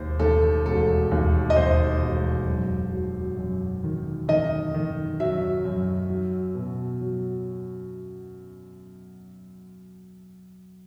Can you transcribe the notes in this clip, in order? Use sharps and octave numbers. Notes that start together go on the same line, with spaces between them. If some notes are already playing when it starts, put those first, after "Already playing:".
Already playing: E1 D#2 C5
D#2 A4
E1 A4
D#2
D#5
D#2 C5
E1
F#2
F#3
F#2
D#3
D#3 D#5
D#3
F#3 E5
F#2
F#3
B2
F#3